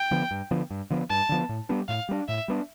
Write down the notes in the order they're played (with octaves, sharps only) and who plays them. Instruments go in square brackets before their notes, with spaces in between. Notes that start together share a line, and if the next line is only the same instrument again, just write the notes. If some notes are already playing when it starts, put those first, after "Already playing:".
Already playing: [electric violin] G5
[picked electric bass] D3 F3 B3
G2
D3 F3 B3
G2
D3 F3 B3
[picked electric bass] G2 [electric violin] A5
[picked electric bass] D3 F3 B3
A2
G3 B3 D4
[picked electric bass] A2 [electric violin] F5
[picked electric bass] G3 B3 D4
[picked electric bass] A2 [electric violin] E5
[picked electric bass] G3 B3 D4